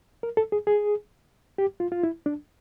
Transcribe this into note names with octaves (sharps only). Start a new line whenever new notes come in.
A#4
A4
G#4
G#4
G4
F4
F4
E4
D4